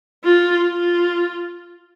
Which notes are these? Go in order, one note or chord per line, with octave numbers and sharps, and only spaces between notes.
F4
F4